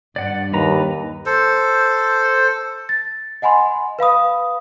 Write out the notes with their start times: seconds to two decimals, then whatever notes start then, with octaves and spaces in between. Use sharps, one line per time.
0.16 G2 D5 F#5
0.53 D#2 B4 A#5
1.26 A4 C5
2.89 A6
3.42 D#5 F#5 G#5 B5 C6
3.99 B4 F5 B5 D#6